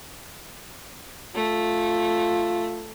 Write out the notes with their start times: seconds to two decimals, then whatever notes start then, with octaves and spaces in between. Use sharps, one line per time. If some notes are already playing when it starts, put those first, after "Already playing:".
1.35 A3 F4